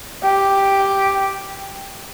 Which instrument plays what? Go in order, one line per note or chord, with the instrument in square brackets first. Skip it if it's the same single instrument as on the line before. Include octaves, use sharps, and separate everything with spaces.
[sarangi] G4